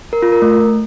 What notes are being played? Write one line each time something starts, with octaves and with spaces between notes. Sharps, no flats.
A#4
F4
A#4
A3